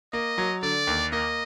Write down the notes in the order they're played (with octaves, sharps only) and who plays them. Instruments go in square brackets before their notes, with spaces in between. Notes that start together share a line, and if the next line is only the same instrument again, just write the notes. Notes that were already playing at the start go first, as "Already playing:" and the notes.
[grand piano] A#3 [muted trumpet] D#5
[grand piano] F#3
[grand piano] D3 [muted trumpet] D5
[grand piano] D#2
[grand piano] A#3 [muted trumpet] D#5